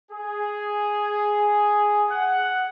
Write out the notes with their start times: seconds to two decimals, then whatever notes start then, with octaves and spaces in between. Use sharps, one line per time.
0.11 G#4
2.10 F#5